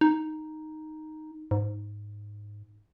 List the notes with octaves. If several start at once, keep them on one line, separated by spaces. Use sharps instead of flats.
D#4
G#2